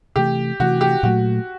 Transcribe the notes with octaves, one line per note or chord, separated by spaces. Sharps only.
C3 E3 A3 G4
C3 E3 A3 F#4
G4
A#2 F#3 A3 F#4